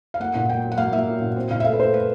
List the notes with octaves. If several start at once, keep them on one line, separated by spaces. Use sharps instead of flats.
F5
A#3 F#5
A#2 F#5
A#3 G5
F#3
F#5
A#3 F5
A#3 E5
F#3
A#2
C4
A#2 F5
E5
A3 F5
B4
A3 C5
A3 B4